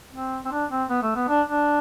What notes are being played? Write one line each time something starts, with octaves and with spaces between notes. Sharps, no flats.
C4
C4
D4
C4
B3
A3
B3
D4
D4